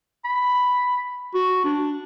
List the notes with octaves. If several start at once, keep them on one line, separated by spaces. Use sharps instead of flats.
B5
F#4
D4